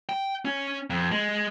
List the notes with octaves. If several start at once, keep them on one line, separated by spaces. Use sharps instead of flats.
G5
C#4
F2
G#3